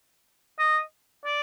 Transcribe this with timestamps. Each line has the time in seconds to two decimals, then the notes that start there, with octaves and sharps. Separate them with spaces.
0.59 D#5
1.25 D5